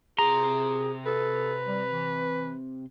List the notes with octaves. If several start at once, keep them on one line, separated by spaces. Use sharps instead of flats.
C3 G#4 A#5 C6
A4 B4
G3
E3